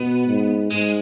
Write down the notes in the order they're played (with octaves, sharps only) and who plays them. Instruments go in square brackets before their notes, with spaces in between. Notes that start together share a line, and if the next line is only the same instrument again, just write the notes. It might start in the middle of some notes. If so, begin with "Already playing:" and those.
Already playing: [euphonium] B2 [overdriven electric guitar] B3
[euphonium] G#2
[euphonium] G#2 [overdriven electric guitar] G#3